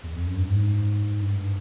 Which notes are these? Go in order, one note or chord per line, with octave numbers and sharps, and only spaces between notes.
E2
F2
F#2
G2
G#2
G2